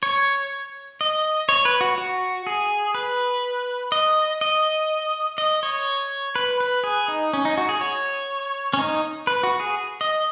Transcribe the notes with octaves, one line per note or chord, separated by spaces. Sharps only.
C#5
D#5
C#5
B4
F#4
F#4
G#4
B4
D#5
D#5
D#5
C#5
B4
B4
G#4
D#4
C#4
D#4
F#4
G#4
C#5
C#4
D#4
B4
F#4
G#4
D#5